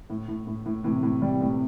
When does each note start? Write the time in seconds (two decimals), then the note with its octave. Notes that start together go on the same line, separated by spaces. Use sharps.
0.10 A2
0.28 A2
0.47 A2
0.66 A2
0.84 A2 C3 E3
1.03 A2
1.21 C3 G3
1.41 A2
1.50 C3